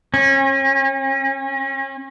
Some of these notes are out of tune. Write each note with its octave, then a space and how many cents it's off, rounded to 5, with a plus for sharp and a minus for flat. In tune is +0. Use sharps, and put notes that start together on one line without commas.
C#4 -35